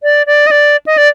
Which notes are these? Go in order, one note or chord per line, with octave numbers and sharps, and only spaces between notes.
D5
D5
D#5
D5
D#5
D5